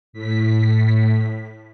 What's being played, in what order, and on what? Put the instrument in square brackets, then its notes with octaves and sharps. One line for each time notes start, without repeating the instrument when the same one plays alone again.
[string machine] A2 B6